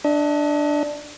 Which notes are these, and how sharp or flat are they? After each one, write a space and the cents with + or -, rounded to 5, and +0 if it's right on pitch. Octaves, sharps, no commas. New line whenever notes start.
D4 +5 D#5 +45